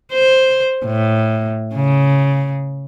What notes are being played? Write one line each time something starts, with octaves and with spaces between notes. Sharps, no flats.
C5
A2
C#3